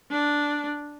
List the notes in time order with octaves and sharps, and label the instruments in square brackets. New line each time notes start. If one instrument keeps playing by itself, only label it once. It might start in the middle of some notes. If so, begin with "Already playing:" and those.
[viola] D4